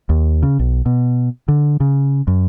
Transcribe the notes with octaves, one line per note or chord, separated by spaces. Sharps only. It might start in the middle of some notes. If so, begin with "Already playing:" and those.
D#2
C#3
B1
B2
D3
C#3
F#2